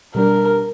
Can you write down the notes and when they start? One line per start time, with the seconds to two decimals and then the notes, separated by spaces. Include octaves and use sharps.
0.15 B2 G3 B3 D4 A#4